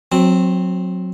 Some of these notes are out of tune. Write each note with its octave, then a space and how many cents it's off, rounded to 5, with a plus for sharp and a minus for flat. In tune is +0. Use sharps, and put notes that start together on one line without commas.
F#3 -20 C4 +0